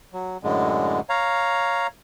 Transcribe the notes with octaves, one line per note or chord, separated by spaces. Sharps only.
F#3
F#2 A2 D3 G#3
C#5 F5 A#5